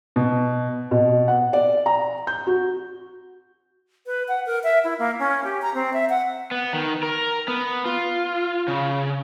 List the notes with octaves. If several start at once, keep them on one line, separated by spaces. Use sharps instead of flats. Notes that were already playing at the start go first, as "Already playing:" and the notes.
B2
B2
F#5
D5
A#5
G6
F#4
B4
F#5
A#4
E5
E4
A#3
C#4
G4
A#5
C4
E5
F#5
B3
D#3
A#4
B3
F4
C#3